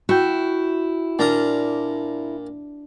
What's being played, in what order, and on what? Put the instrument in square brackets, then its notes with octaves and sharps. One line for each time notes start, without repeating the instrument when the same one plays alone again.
[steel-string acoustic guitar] E4 [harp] F#4 G5
[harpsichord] A#2 A#5 D#6 [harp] D4 F6